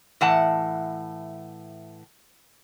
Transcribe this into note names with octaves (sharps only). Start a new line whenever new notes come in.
A2 E3 F#5 A5